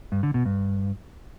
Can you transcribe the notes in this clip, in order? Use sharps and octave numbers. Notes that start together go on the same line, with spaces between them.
G2
D3
B2
G2